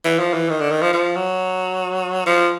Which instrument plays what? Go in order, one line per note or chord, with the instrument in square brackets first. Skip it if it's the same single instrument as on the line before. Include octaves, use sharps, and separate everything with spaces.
[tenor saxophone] E3
F3
E3
D#3
D3
D#3
F3
F3
F#3
F3